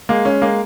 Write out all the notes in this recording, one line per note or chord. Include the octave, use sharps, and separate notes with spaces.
G#3 A#3
G#3 C#4
G#3 A#3